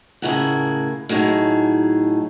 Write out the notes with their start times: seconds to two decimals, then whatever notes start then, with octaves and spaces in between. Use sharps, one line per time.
0.22 A2 C#3 A#3 G#4 A#4 F#5
1.09 A2 F#3 D#4 G#4